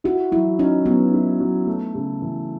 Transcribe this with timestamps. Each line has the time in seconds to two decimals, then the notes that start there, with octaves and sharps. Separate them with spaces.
0.04 E4 F#4
0.31 F#3 E4
0.59 C#4 D#4
0.86 F#3 B3
1.14 E4
1.40 F#3
1.67 A3
1.95 C#3
2.22 E3